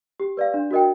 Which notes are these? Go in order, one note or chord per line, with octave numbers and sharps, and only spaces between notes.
G4
B4 D5 F5
D4
F#4 A#4 D#5 G5